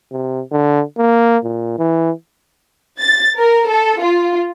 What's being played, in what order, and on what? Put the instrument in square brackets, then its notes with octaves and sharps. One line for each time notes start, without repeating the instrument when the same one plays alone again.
[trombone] C3
D3
A#3
A#2
E3
[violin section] A6
A#4
A4
F4